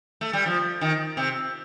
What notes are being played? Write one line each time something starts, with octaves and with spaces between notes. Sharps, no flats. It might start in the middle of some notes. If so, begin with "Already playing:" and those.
A3
G3
F3
D#3
C3